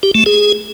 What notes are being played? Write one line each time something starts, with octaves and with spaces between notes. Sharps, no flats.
G4
A3
G#4